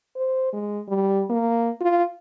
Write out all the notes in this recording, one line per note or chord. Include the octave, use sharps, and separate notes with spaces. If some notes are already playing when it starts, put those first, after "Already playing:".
C5
G#3
G3
A#3
F4